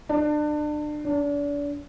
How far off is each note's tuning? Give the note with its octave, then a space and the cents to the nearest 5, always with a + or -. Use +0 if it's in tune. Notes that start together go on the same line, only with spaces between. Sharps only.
D4 +30
D4 -35